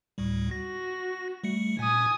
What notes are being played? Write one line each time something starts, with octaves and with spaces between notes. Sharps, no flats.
D2 A2 G3
F#4 A#6
G3 A3 C#7
A#2 G#5 D#6